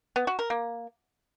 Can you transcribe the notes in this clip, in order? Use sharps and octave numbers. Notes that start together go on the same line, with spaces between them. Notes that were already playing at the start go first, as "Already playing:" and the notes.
B3
F#4
A#4
A#3